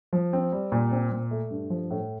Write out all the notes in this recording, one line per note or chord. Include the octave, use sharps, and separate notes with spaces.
F3
C4
G3
A#2
C4
A#2
A3
G2
F3
A2